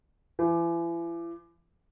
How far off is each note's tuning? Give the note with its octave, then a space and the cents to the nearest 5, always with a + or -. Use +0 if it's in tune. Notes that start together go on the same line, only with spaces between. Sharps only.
E3 +40